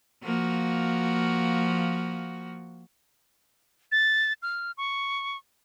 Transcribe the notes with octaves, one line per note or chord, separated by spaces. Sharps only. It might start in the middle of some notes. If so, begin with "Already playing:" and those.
F3 A#3 F#4
A6
F6
C#6